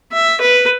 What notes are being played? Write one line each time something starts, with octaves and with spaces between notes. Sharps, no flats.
E5
B4